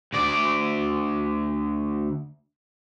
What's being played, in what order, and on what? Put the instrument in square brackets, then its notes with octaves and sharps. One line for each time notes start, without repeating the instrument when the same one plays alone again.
[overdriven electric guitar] D2 D5